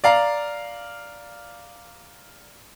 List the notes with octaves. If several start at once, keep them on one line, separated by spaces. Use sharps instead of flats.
D5 F5 A#5